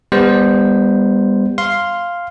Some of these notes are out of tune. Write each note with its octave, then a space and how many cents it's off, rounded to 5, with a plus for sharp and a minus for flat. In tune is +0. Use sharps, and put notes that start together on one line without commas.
G3 +35 B3 +0 C5 +0
F5 +0 C6 +0